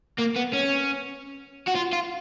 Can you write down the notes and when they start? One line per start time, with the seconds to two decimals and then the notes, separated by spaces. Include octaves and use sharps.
0.18 A#3
0.36 B3
0.53 C#4
1.68 F#4
1.76 F4
1.93 F4